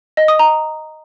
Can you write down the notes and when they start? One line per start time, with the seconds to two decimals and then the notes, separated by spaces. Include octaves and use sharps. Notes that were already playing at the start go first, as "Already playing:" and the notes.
0.17 D#5
0.28 D#6
0.39 A#5